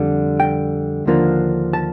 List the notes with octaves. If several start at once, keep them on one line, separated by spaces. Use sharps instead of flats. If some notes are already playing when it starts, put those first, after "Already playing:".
Already playing: F2 D3 G3
G5
D#2 D3 F3 A#3 D4
A5